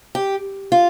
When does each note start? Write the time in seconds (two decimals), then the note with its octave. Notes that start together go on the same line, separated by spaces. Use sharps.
0.15 G4
0.72 F4